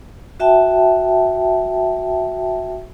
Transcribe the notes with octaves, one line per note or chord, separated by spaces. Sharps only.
F#4 E5 G5 A5